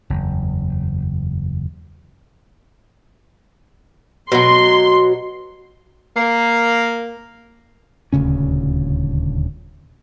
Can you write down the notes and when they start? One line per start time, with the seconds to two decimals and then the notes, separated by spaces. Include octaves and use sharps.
0.10 F#1 E2
4.32 B2 F#3 C6
6.16 A#3
8.13 D#1 D2 C#3 C#4